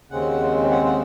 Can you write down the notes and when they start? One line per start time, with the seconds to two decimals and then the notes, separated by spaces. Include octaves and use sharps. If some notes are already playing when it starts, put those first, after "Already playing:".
0.10 D#2 C#3 G#3 C4 F#5
0.71 F#5
0.86 F#5